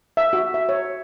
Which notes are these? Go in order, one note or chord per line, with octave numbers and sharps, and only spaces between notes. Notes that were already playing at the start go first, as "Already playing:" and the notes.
E5
F#4
E5
C#5